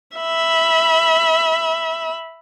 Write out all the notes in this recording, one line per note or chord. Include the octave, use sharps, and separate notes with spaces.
E5 B5